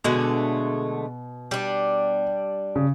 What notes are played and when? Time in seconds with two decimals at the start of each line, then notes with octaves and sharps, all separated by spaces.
0.04 B2 D3 G#3 A3
1.51 G3 D4
2.76 C#3